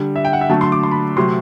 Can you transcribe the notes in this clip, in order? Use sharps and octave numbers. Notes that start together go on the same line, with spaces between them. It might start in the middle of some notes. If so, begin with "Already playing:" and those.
Already playing: D3 G3
E5
G5
F#5
E5
D3 F#3 A3 A5
C6
D6
C6
B5
C3 F#3 A3 C6